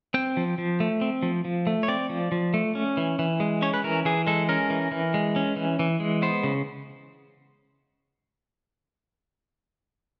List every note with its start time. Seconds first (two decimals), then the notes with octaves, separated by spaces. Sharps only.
0.14 C4 G5
0.37 F3
0.58 F3
0.80 A3
1.01 C4
1.23 F3
1.45 F3
1.67 A3
1.83 C#5
1.88 C4 D5
2.10 F3
2.32 F3
2.54 A3
2.75 C#4
2.97 E3
3.19 E3
3.40 G#3
3.62 C#4 C#5
3.74 B4
3.84 E3 A#4
4.05 E3 G#4
4.27 G#3 A4
4.49 C#4 A#4
4.70 E3
4.92 E3
5.14 G#3
5.36 C#4
5.56 E3
5.79 E3
6.00 G#3
6.22 B3 C5
6.43 C#3